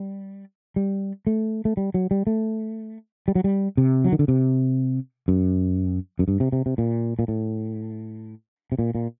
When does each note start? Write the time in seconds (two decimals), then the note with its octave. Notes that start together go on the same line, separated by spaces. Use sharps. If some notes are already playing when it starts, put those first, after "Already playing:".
Already playing: G3
0.76 G3
1.27 A3
1.65 A3
1.77 G3
1.94 F#3
2.11 G3
2.27 A3
3.28 G3
3.35 F#3
3.44 G3
3.77 C3
4.05 F#3
4.12 D#3
4.19 D3
4.28 C3
5.28 F#2
6.19 F#2
6.28 G2
6.40 C3
6.52 C3
6.66 C3
6.78 A#2
7.19 A#2
7.28 A2
8.72 C3
8.79 A#2
8.95 A#2